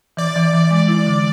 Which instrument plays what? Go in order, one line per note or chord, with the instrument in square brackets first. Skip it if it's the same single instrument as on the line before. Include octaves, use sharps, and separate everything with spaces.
[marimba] E3 [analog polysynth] D5
[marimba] E3
E3
G#3
E4
D3